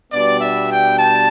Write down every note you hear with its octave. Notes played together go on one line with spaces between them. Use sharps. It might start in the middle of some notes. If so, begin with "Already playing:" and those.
B2 G3 B3 D4 D5
E5
G5
A5